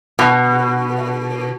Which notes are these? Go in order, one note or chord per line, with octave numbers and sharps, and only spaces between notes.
B2